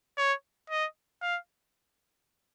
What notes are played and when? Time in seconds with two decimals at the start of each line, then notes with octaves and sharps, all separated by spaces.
0.17 C#5
0.70 D#5
1.22 F5